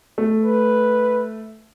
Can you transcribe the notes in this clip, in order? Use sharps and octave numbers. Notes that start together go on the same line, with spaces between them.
A3
B4